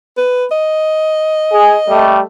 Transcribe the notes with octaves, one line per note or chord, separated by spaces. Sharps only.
B4
D#5
G#4
G3 A3